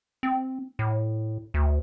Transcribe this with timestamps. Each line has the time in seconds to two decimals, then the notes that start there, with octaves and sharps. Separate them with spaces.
0.23 C4
0.79 A2
1.54 D2